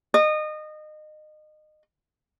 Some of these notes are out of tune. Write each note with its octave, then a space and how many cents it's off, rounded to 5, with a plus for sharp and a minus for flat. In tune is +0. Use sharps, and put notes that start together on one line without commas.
D#5 -25